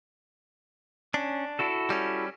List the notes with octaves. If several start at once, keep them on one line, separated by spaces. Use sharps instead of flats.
C#4 D4
E4 F#4 A4
G3 C#4